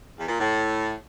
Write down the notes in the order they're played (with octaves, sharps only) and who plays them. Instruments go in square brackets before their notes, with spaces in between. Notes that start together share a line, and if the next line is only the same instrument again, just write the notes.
[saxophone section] E2
A#2
A2